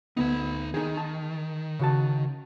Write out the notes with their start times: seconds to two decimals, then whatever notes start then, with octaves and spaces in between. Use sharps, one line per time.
0.17 D2 B3 D#4 B5
0.74 D#3 D#4 G#4
0.97 A5
1.79 C#3 F#4 A5